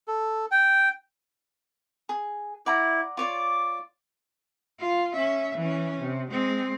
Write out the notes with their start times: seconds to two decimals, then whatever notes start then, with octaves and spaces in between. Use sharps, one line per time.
0.07 A4
0.51 G5
2.09 G#4
2.66 E4 D5 F#5 A#5
3.17 F4 C#5 D5 D6
4.80 F4
5.14 C#4 E5
5.58 E3 C#4
6.01 C3
6.31 G#3 C4